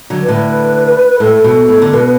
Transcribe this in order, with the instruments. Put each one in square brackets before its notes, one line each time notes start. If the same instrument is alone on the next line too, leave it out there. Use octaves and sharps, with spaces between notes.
[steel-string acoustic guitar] D3 F#3
[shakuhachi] B4
[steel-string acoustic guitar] A2 D3
[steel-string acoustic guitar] A2 [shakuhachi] A4
[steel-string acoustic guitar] B2
A2
D3
[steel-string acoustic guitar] B2 [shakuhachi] B4